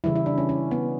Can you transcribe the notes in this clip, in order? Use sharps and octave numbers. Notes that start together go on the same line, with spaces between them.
C#3 E3 G3 E4
E4
D4
C#4
C#4
B3